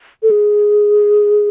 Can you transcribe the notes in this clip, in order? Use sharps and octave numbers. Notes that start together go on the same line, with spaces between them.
A4
G#4